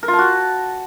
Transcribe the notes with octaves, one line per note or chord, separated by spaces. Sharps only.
A#4
F4
A5
F#4